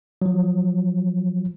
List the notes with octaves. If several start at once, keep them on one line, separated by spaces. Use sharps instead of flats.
F3 F#3